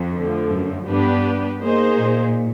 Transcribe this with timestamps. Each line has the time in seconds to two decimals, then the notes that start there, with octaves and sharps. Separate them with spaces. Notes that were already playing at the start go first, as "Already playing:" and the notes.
Already playing: F2
0.13 D3 F3 A3
0.50 F#2
0.87 G2 B3 D4 G4 B4
1.61 A#3 D#4 G#4 C5
1.99 A#2